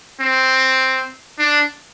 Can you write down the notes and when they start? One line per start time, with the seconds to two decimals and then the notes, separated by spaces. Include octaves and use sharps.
0.20 C4
1.39 D4